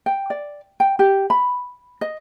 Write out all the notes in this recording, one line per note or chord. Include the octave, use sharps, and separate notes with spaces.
G5
D5
G5
G4
B5
D#5